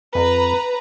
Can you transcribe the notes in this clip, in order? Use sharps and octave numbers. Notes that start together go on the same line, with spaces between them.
F2 B4 A#5